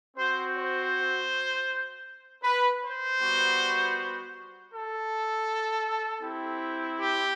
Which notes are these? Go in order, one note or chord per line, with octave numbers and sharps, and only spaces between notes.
C4 F#4 C5
C5
B4
C5
G3 B3 F#4
A4
C4 E4 G4
G4